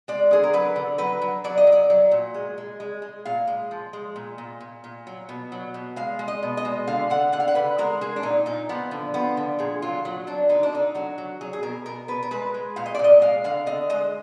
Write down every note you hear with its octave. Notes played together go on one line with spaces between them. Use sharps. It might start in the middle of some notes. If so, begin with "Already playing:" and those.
G#3 D5
D3 G#4
A#4
F#3 B4
D3
F#3 B4
F#3
F#3 D5
D#5
F#3
D5
F#3
A#2
G#3
G#3
G#3
G#3
A#2 F5
G#3
F3
G#3
A#2
A#2
A#2
A#2
F#3
B2
F#3
B2
G#3 F5
G#3
D#5
B2
D#5
G#3
D3 F5
D3 F#5
D3 F#5
F5
F#5
D3 B4
G#3 A#4
G#3 G#4
D4
A#2 D#4
A#2 D#4
F3 B3
D3
F3 B3
D3
A#2 G#4
F#3 F4
F#3
F#3 D4
D3 D#4
D4
D3 D#4
F#3 F#4
F#3
F#3 G#4
G#4
B2 A#4
B2 A#4
B2 B4
A#4
G#3 B4
G#3
A#2 F5
D#5
D5
A#2
D#5
G#3 F5
D3 F5
D3 D#5
G#3 D#5